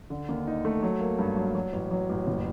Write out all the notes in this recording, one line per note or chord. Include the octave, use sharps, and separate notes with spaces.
D3
D#2
D#4
A3
F#3
A#3
G2
F#3
F#3
A1
F#3
A1
F#1